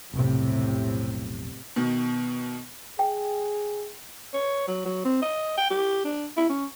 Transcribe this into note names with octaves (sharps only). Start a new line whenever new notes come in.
F1 B1 A2 C3
B2 D#3
G#4 G5
C#5
F#3
F#3
C4
D#5
G5
G4
D4
E4
C#4